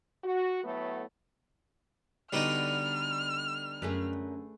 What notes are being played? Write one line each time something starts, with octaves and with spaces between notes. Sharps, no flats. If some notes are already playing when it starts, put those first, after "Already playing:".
F#4
A2 F#3 A3 B3
D3 G3 B3 D#4 F#4 B5 F6
F#2 A3 G#4 B4